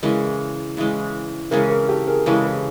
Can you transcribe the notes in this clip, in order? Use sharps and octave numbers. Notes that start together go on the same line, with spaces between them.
C#3 E3 G#3 C#4 G#4 A#4
C#3 E3 G#3 C#4
C#3 E3 G#3 C#4 G#4 A#4
G#4 A#4
G4 A4
G#4 A#4
C#3 E3 G#3 C#4 A4 B4
A4 B4